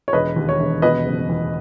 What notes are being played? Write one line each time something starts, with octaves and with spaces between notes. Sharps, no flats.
C#5
E1 B4 D#5
D#2
C#5
E1
B2 B4 D#5
F#1
E2